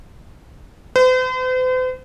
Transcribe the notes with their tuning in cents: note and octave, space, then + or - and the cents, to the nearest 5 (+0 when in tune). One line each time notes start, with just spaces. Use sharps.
C5 -45